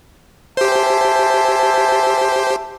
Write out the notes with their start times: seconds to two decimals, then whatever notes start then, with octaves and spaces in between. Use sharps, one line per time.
0.57 G4 C5 E5 G#5 A5